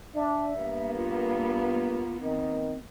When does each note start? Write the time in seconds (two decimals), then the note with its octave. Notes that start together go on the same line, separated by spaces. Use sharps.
0.15 D4 E5
0.56 G2 A#3 B3
0.97 F4
2.21 D#3 C4